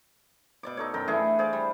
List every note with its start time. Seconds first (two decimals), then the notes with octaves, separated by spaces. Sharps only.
0.63 B2 D5 D6
0.77 D#4 A4 C#5
0.94 F#2 A4 A#4 G5
1.08 E3 A3 D4 G#4
1.39 G#4 C5 D5 F5
1.53 G3